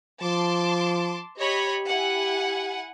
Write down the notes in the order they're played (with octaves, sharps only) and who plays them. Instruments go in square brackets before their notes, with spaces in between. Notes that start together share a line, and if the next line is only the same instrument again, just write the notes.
[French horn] F3 [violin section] A5 C6 D6
[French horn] G4 [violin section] C#5 D#5 B5
[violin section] E4 F#5 G#5